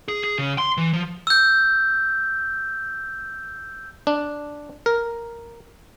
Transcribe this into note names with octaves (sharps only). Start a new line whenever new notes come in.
G#4
G#4
C#3
C6
E3
F3
E6 G6
D4
A#4